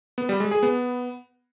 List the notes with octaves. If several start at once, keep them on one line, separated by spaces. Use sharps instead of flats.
B3
G3
G#3
G#4
B3